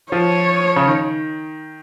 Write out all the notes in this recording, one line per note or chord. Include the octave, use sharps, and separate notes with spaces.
F3 C#5
C#3
D#3